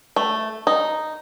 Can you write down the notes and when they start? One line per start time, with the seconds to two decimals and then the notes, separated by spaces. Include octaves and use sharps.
0.16 A3
0.67 D#4